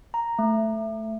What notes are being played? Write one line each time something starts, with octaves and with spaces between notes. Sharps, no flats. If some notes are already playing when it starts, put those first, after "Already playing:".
A#5
A3